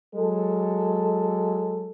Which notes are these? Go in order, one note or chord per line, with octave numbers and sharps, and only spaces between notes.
F#3 G#3 A4